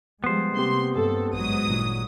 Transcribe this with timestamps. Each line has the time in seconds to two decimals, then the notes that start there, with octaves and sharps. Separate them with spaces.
0.24 F3 G3 G#3 B3 C5
0.55 C3 A#3 C4 G4 C6
0.95 G2 A4
1.33 A1 G#2 F#3 D#6
1.67 G#1 G2 A#2